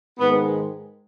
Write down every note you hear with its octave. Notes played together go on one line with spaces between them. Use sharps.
G#2 D#3 G#3 B3